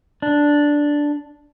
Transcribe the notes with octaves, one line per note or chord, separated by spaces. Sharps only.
D4